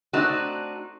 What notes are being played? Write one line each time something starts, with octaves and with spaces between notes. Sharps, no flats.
A3 C4 D4 D#4 F#4